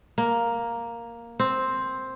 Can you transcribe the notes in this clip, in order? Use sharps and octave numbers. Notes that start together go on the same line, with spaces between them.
A#3
C4